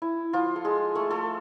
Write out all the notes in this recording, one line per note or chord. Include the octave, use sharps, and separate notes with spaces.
E4
F3 F4
A4
G#3 G#4
A3 A4
A3 A4